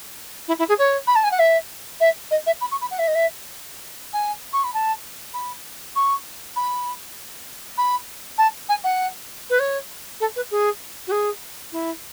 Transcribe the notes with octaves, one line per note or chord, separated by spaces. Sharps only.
E4
E4
G#4
C#5
B5
A5
G#5
F#5
E5
E5
D#5
E5
B5
C#6
B5
F#5
E5
D#5
E5
G#5
C#6
B5
A5
B5
C#6
B5
B5
A5
G#5
F#5
B4
C#5
A4
B4
G#4
F#4
G#4
E4